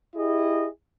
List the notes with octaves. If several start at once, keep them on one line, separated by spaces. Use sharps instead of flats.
E4 G4 G#4 D#5